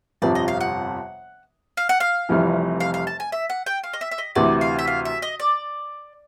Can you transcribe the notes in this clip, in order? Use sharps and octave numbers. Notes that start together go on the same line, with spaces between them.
G1 F2 C3 F3 D5
D#5
F5
F#5
F5
F#5
F5
F1 F2 C3 E3 G3
F5
F5
A5
G#5
E5
F#5
G5
F5
D#5
E5
E5
D#5
D2 C3 E3 D5
F5
E5
F5
E5
D#5
D5